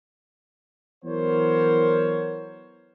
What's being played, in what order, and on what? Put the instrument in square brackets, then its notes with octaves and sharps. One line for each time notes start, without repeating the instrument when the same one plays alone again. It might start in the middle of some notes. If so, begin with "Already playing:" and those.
[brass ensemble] E3 F#3 B3 A#4 C5 C#5